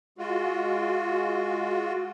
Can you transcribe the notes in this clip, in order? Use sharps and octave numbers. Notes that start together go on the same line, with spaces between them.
G#3 F4 F#4